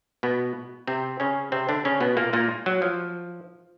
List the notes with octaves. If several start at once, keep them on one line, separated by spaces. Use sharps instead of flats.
B2 B3
C3 C4
C#3 C#4
C3 C4
D3 D4
C#3 C#4
B2 B3
A#2 A#3
A#2 A#3
F#3
F3